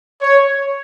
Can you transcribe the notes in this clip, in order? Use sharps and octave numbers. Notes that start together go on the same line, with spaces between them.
C#5